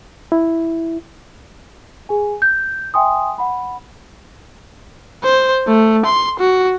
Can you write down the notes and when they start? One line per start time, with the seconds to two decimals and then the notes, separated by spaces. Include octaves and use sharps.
0.32 E4
2.09 G#4 G#5
2.42 G6
2.94 E5 G5 G#5 C6 D#6
3.38 F#5 B5
5.23 C5
5.68 A3
6.05 C6
6.40 F#4